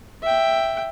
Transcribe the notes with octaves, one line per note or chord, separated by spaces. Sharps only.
E5 G5